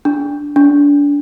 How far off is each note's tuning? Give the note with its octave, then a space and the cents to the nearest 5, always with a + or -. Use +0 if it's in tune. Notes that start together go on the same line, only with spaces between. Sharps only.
D4 -5
D4 -30